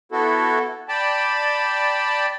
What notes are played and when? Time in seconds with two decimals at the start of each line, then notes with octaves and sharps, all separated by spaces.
0.12 B3 E4 F#4 A4
0.89 D5 G5 A5 B5